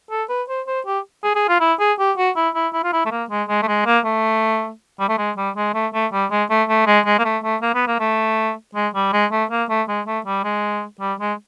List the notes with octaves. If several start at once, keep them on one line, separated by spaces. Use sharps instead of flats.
A4
B4
C5
C5
G4
G#4
G#4
F4
E4
G#4
G4
F#4
E4
E4
E4
F4
E4
A3
A#3
G#3
G#3
A3
G#3
A#3
A3
G3
A3
G#3
G3
G#3
A3
A3
G3
G#3
A3
A3
G#3
G#3
A#3
A3
A3
A#3
B3
A#3
A3
G#3
G3
G#3
A3
A#3
A3
G#3
A3
G3
G#3
G3
G#3